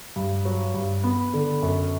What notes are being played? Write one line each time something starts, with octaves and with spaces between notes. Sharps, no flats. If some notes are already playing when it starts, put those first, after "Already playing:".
G2
F#3
G2
B3
D3
F#2